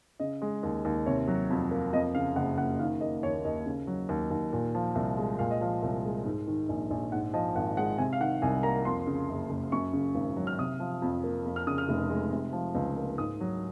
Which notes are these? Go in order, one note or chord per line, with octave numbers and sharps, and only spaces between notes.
C#3 D#5
G#3
D#2
D#2
C3 C#5
F#3
F2
A#3
F2 D#5
C#3 F5
F#1 F#5
F#1 F#5
D#3 F5
A#3 D#5
D#2 C#5
D#2 D#5
C#3
F#3
D#2
D#2
A#2
F3
C2
G#3
A#2 F5
D#5
F3 F5
C2
G#3
G#2
D#3
A#1
A#1
G#2 F#5
F3 D#5
G#1 F#5
G#3 F#5
C3 G#5
F5
D#3 F#5
C2 G#5
A#3 A#5
F2 C6
C#3
F#1
F#1
F#2 C#6
C#3
G#1
F#3
F6
C3 D#6
F3
F2
A#3
F2
F6
C#3 D#6
F6
F1
G#3
C3
F3
C#2
A#3
G#2 D#6
F#3